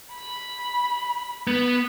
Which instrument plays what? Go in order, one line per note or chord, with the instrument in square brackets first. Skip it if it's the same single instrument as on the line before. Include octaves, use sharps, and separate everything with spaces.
[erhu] B5
[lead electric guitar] B3